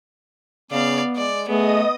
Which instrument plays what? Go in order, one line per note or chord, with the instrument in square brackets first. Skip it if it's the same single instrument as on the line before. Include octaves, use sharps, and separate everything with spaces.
[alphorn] C#3 [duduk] B3 [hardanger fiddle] D5 F5
[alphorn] G#3 [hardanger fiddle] D5
[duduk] A3 [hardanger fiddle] B3 [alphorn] G#4 [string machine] D#5 D#6